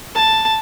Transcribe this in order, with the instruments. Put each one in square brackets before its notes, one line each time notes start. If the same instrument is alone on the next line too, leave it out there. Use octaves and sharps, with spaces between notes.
[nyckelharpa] A5